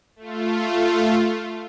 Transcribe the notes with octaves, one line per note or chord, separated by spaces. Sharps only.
A3 F4